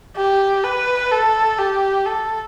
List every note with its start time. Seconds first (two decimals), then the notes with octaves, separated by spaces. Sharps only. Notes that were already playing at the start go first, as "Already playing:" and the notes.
0.17 G4
0.64 B4
1.11 A4
1.59 G4
2.06 A4